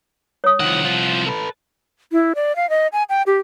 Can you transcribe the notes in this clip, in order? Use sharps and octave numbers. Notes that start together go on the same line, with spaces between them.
C#5 D#6
C2 D#3 F3 F#5
F3
A4 B4
E4
D5
F5
D#5
G#5
G5
G4